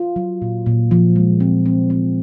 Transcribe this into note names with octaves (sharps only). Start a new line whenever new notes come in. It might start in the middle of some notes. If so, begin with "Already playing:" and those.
Already playing: F4
F#3
A#2
A#2
F3
G#3
C4
C4
C4